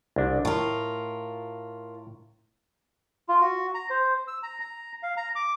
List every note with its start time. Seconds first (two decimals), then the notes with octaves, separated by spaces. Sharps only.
0.16 C2 D4
0.45 A2 F4 A#4
3.29 F4
3.41 F#4
3.74 A#5
3.90 C5
4.28 E6
4.43 A#5
4.60 A#5
5.03 F5
5.17 A#5
5.36 D6